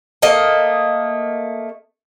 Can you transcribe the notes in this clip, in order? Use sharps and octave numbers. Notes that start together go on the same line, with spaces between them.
A3 A#3 D#5